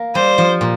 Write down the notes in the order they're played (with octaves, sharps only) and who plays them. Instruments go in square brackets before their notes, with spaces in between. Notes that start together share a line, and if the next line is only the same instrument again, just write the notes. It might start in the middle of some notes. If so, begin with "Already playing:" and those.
Already playing: [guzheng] A#3
[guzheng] G3 [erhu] C5
[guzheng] F3
A#2